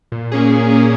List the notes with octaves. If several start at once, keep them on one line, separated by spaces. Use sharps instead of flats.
A#2
A#3 C#4 G#4
A#2
A#3 C#4 G#4